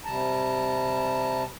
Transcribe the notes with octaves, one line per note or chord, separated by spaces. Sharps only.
C3 G3 A5 A#5